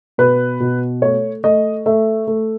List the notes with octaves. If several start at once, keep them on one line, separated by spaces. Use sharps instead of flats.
B2 B4
B2
A3 C#5
A3 D#5
A3 E5
A3